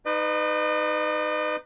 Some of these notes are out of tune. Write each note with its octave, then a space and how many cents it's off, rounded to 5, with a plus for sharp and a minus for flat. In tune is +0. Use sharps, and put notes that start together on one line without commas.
D#4 +0 B4 +20 D#5 -40